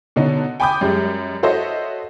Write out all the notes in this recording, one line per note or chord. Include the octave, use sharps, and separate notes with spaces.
B2 D3 C#4 D#4
G5 G#5 B5 D6 D#6 G6
F#2 G3 G#3
F#4 A4 C5 C#5 D#5 E5